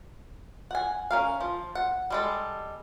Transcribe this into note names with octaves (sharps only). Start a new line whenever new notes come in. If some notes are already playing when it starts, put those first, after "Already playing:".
F#5 G#5
C#4 A#4 F5
F3
F#5
G3 G#3 A4